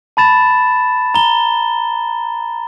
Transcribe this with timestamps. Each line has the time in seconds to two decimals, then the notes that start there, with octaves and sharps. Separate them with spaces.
0.17 A5 B5 A6 E7
1.14 A#5 G7